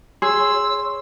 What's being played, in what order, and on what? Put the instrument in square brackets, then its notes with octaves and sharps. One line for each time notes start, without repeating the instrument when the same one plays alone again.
[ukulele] G#4 [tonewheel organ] C#5 [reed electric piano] C6 [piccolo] E6